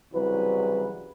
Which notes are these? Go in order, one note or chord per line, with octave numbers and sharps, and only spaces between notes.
C2 C#3 E3 F#3 B4